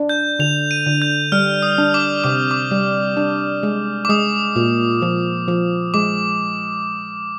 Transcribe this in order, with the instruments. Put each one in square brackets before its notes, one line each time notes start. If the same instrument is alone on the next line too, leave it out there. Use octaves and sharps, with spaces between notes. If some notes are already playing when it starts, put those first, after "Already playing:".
Already playing: [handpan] D4
[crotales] G6
[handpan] D3 [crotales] F7
[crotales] D#7
[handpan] D3
[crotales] G6
[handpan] G3 [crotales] F6
[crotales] D#6
[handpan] D4
[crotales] D6
[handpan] C3 [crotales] D6
[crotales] D6
[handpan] G3
D4
G#3
[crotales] D6
[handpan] G#3 [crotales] D#6
[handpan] A#2
F3
F3
[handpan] G#3 [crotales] D6